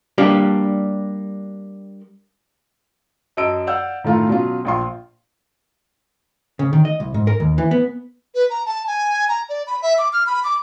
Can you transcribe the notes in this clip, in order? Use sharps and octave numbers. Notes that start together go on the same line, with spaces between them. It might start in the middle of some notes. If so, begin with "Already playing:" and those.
G3 A#3 D4 G4
F#2 D#5 A5 E6 D7
D5 F5 F#5 E6 G6
A2 D#3 A3 F4 F5 A#5
B2 F#3 C#4 F4
A#1 F4 C6
C#3
D#3
D#5
C2
G#2
A#4
D#2
E3
B3
B4
A#5
A5
G#5
A#5
D5
B5
E5
D6
F6
B5
D6